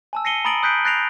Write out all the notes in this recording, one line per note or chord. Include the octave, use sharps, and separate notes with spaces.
G#5 A5 E6
A#6 C7 C#7 D#7 G7
A#5 B5 D#6 A6 D7 F#7
D#6 F#6 G6 B6 C7 D7
F#6 A6 A#6 C7 D7 F7